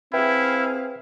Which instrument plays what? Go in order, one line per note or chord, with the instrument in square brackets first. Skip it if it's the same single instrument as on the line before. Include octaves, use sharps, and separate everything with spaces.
[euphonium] C4 [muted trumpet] E4 [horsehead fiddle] G#4 F5 [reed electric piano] B4 E5 G5